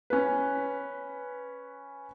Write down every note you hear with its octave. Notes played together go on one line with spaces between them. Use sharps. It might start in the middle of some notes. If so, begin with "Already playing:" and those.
C#4 B4